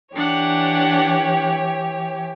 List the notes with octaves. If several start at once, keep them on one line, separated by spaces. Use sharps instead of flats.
E3 D4 G4 C#5 F#5